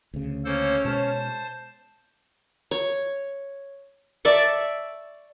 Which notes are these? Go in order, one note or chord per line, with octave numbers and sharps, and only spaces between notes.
D2 C#3
A#3 C#4 A4 C5 C#5
B2 G#3 C5 A5
C#5
D5 E5 A5 C#6